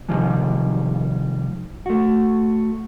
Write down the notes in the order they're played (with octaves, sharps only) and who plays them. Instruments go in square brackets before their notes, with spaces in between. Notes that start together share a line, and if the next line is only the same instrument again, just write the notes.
[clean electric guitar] C3 D#3 F3 G3 G#3
A3 F#4